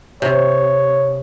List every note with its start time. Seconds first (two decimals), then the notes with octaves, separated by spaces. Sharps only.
0.22 C3 C#5